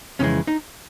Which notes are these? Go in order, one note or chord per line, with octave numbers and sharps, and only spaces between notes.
F2 C#3 E3 G#3 C#4
D#4